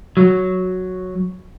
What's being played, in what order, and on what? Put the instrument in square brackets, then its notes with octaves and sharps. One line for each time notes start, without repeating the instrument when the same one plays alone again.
[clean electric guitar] F#3